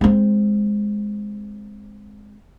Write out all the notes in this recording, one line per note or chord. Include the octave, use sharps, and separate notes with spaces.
G#3 C4